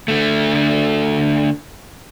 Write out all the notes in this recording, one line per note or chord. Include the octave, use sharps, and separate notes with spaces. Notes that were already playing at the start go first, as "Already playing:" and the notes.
D3 A3